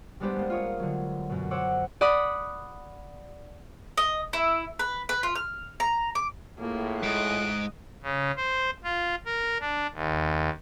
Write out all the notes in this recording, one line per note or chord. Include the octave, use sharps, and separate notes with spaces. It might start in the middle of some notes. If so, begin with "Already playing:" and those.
G3 G#3 B3 D4 G4 C5
G#3 A#3
F4 C#5 D#6
D3 F#3
F#2 B2
C5 C#5 F#5 D6 E6
D5 F#5 B5 D#6
D#5
E4
B4
B4
F4
F6
A#5
D6
A2 A#3 F4 G#4
G#2 D#5 F#6 D7
C#3
C5
F4
A#4
D4
D#2